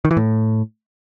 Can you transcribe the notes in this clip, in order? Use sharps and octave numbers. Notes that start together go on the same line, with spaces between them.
D#3
E3
A2